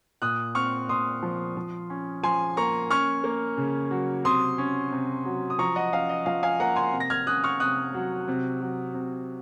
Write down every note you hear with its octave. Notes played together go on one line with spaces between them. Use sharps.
A#2 D#6 F#6
C4 C#6 F6
A#2 C6 D#6
F3
F3
C#4
F3 G#5 C6
A#3 A#5 C#6
C#4 C#6 F6
A#3
C#3
F#3
C3 C6 D#6
C#4
C3
F#3
D#6
F3 A#5 C#6
D#5 F#5
C#4 F5
D#5
F3 F5
F5 G#5
A#3 F#5 A#5
G#5 C6
C3
A#6
F6 G#6
C#4 D#6 F#6
C#6 F6
C3 D#6 F#6
F#3
C3
F#3
C3